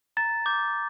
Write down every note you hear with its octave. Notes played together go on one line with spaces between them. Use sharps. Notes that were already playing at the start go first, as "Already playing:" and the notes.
A#5 A6
D6 G6